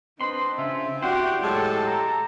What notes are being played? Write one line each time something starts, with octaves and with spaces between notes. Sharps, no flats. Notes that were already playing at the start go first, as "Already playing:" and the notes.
C4 D4 B4 D#5 C6
C#3 F4 E5
E4 F#4 G4 C5 D5 F#5 G5
A2 F#3 G#3 A4 A5
A#5